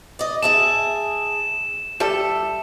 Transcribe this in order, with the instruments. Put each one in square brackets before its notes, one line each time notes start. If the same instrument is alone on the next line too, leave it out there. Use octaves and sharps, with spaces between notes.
[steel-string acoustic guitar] D5 D#5
[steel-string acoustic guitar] G#4 E5 A5 [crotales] E7
[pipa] G3 A4 [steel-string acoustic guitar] E5